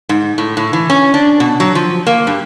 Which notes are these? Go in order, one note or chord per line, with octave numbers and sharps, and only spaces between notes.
G#2
A2
A2
E3
C#4
D4
B2
F#3
F3
A#3
G2